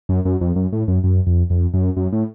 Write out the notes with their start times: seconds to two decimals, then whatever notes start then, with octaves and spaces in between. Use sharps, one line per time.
0.09 F#2
0.25 F#2
0.41 F2
0.56 F#2
0.73 A2
0.88 F#2
1.04 F#2
1.27 F2
1.50 F2
1.74 F#2
1.97 F#2
2.13 A2